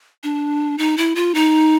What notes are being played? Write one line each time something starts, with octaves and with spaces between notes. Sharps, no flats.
D4
D#4
E4
F4
D#4